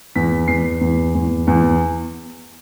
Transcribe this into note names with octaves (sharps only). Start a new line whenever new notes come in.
E2 B6
E2 C7
E2
E2
E2